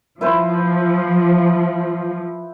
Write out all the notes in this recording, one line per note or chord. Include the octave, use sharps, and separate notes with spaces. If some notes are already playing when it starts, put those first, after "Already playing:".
F3 E4 B4 C5